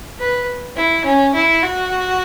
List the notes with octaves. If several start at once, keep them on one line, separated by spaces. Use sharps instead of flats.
B4
E4
C#4
E4
F#4